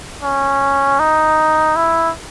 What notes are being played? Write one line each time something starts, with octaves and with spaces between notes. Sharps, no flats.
C#4
D#4
E4